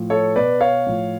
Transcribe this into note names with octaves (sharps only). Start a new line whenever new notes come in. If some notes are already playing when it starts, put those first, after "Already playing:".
Already playing: A2 F3
A4 C#5
B2 B4 D5
C#5 F5
A2 F3